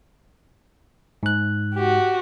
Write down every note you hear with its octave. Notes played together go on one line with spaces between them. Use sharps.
G#2 F#6
F#4 G4